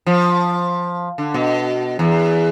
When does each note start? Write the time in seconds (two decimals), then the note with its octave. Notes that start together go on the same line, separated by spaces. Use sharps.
0.07 F3
1.18 D3
1.34 B2
1.99 E2